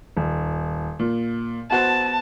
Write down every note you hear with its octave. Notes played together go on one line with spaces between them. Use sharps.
D#1
A#2
B3 F#4 C5 A5